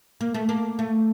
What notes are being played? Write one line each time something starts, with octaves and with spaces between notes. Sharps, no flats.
A#3
A3
A#3
A3